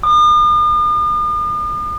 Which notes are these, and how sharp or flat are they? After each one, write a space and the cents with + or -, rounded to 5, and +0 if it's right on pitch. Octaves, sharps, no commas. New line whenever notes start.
D#6 -45